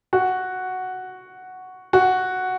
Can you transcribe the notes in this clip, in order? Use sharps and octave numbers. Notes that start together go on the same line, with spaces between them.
F#4
F#4